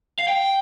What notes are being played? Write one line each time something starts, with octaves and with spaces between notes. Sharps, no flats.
F5
G5